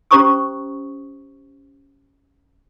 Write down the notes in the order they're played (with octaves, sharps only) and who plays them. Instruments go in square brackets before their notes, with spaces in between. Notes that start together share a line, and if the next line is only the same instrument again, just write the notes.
[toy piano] C#4 G4 C5 A#5 C#6 D#6